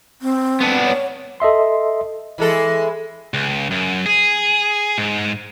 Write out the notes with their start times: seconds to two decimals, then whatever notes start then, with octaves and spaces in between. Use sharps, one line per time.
0.22 C4
0.60 B3 D4
0.85 C#5
1.40 A4 D#5 E5 C6
2.38 E3 G#3 A4
3.34 C#2
3.71 F#2
4.06 G#4
4.98 G#2